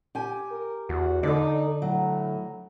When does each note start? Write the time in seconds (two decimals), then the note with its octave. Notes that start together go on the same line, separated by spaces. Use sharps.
0.15 G4 G#5
0.51 A#4
0.89 E2 F#4
1.23 D3 D#4 A4 D5
1.82 A2 F#3